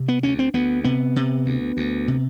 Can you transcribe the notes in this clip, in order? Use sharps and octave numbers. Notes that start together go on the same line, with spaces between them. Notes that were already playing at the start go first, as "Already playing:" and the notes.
Already playing: C3
B3
D2 C#4
C4
D2 B3
C3 B3
C3
D2
D2
C3